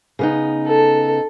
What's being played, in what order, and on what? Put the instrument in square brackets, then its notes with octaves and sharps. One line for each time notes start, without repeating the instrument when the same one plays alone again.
[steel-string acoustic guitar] C#3 B3 D#4
[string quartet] A4